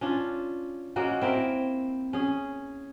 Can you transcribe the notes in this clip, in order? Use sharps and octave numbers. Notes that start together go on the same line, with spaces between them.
C#4 D4 F4
G#3 A#3 C#4 F#4
C4 E4 A#4 F5
C#4 G#4